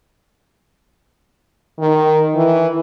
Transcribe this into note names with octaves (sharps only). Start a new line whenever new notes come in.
D#3
E3